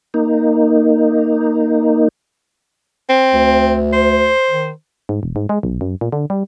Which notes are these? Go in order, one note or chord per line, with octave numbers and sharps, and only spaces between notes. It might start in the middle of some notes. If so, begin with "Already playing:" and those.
A#3 D#4
C4
D2
C5
D#3
G#2
E1
G#2
G#3
B1
F#2
A#2
D3
G3